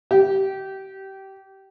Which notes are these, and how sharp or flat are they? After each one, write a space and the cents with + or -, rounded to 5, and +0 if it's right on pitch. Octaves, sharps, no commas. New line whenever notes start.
G4 -25